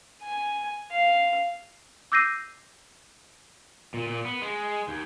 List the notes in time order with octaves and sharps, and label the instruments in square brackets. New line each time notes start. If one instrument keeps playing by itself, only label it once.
[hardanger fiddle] G#5
F5
[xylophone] D6 E6 G6 A#6 C7 D#7
[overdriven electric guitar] A#2
A#2
B3
G#3
D#2